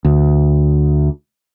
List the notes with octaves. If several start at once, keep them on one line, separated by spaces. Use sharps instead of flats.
D2